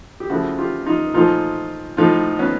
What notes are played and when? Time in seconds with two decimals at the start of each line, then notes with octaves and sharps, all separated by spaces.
0.20 G4
0.30 C#3 F3 A3 E4 F#4
0.58 F4 G4
0.86 D#4 F4
1.14 A#2 F3 A3 D#4 F4
1.97 A2 F3 A3 D#4 F4
2.39 B3 C#4